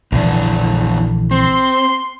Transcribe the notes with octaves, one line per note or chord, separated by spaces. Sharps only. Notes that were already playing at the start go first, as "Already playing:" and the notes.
A#1 E2 D3 E3 D4
C4 C6